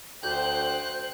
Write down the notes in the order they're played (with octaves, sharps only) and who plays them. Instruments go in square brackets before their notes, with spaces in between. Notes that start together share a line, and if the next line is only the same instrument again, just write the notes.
[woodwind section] D2 [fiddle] C5 F#6 [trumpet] G5 [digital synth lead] G6